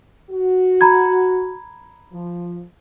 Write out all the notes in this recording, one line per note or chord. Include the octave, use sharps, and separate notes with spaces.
F#4
A#5 B5 G#6
F3